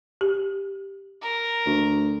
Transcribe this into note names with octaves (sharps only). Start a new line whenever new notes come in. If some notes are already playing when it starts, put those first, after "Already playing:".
G4
A#4
D2